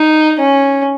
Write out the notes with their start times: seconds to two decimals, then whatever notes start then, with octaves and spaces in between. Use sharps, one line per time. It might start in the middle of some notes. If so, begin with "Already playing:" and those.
Already playing: D#4
0.39 C#4